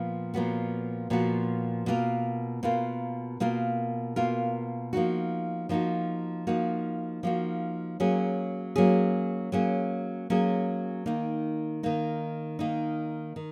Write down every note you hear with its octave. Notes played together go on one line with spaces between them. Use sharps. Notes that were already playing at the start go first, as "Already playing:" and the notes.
Already playing: A#2 F3 B3
A#2 F3 B3 F#4
A#2 F3 B3 F#4
B2 A#3 F4 A#4
B2 A#3 F4 A#4
B2 A#3 F4 A#4
B2 A#3 F4 A#4
F3 A#3 D#4 F#4
F3 A#3 D#4 F#4
F3 A#3 D#4 F#4
F3 A#3 D#4 F#4
F#3 A#3 C#4 G#4
F#3 A#3 C#4 G#4
F#3 A#3 C#4 G#4
F#3 A#3 C#4 G#4
D#3 A#3 D#4
D#3 A#3 D#4
D#3 A#3 D#4
D#3